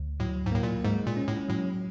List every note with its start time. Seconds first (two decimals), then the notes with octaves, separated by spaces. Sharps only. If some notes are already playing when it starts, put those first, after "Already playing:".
Already playing: D2
0.20 A2 F#3
0.46 G#2
0.52 A2 A#3
0.63 A#2
0.84 G#2 G#3
1.07 A#2
1.17 C#4
1.28 A2
1.49 A2 F#3